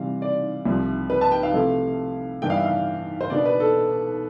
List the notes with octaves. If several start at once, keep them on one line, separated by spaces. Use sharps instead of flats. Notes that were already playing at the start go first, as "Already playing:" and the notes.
Already playing: C3 E3 G3 F5
D5
C2 C3 F3
B4
A5
G5
F5
C3 F3 A3 E4
G2 E3 B3 D4 G5
F5
E5
F5
C5
B2 B3 D4 D5
B4
A4